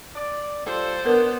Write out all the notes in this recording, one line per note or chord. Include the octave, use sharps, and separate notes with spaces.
D5
G3 F4 A4 C5 D5
B3 D4 A#4